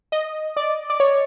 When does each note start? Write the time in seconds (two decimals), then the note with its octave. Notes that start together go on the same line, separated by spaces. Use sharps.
0.12 D#5
0.56 D5
0.90 D5
1.00 C#5